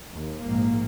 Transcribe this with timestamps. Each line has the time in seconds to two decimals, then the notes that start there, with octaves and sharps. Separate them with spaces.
0.10 D#2
0.42 A#1 G#2 A#3